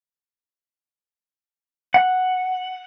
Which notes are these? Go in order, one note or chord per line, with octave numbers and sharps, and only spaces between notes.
F#5